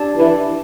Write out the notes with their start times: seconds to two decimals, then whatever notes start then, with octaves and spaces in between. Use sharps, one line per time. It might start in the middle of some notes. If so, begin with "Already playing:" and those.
Already playing: D4 G4 D5 A5
0.17 E3